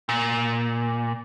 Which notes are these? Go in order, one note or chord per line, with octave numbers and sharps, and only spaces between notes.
A#2